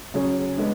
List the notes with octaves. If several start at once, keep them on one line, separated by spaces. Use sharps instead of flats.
C#3 F#3 C#4 G#4 C#5
G#3 B3 D4